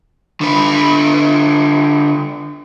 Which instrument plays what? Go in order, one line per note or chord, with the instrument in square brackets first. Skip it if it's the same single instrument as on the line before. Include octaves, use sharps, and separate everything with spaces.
[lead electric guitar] D3 B4